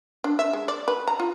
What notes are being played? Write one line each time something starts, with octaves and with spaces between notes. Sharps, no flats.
D4
E5
G#3
D5
B4
A#5
F4